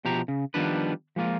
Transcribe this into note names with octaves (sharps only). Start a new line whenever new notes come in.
B2 F3 G4 A#5
C#3
D#3 F3 G3 B3 D4 B4
F3 G#3 A#3 F4